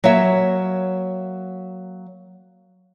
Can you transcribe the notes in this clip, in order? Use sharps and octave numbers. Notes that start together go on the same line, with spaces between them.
F#3 A#3 C#5 E5